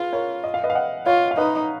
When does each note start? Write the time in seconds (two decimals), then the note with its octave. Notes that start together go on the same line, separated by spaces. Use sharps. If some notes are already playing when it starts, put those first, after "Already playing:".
Already playing: F4 G#4 B4
0.12 A#4 C#5
0.44 D#5
0.54 F5
0.64 B4 D#5
0.70 F5
0.75 D#5 F#5
1.06 F4 C#5 F5
1.31 F5
1.37 D#4 B4 D#5